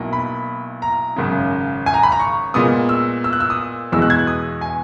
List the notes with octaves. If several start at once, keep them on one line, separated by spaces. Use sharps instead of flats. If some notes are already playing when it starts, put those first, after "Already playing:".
Already playing: B1 B2 A#3 E4
B5
A#5
G#1 F#2 C#3
G#5
A#5
B5
A#5
C#6
A#2 G#3 B3 D#6
E6
E6
F#6
E6
D#6
E2 B2 G#3 B3 E6
F#6
G#6
F#6
D#6
G#5